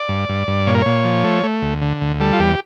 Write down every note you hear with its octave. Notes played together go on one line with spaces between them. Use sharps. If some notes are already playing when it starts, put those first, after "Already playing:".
Already playing: D5
G2
G2
G2
A#2 C#5
A#4
A#2 C#5
F3
A3
A3
D2
D3
D2
G3 A4
F4
E2 G4